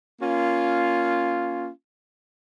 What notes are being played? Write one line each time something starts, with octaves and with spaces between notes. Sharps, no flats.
A#3 C#4 F4